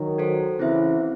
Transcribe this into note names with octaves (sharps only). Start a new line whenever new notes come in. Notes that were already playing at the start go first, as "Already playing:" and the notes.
Already playing: D#3 F#3
F#4 A4 C5
C#3 E3 C4 E4 C5 E5